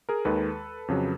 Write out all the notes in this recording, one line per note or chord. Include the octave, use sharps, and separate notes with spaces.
G#4 A#4
D#2 D#3 G#3 A4 B4
F2 C#3 F#3